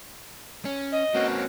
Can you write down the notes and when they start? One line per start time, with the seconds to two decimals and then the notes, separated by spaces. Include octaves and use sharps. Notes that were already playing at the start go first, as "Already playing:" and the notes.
0.65 C#4
0.92 D#5
1.15 A#3 C4 C#4 F#4